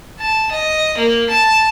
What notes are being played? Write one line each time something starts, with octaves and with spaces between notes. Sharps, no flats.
A5
D#5
A#3
A5